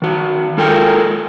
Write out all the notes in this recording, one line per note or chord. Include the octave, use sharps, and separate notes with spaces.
D#3 F#4
G#3 F4 A4 A#4 G5 G#5